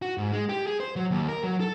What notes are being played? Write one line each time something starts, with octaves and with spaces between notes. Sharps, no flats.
F#4
G#2
G#3
G4
G#4
C5
F#3
D#2
A#4
F#3
A4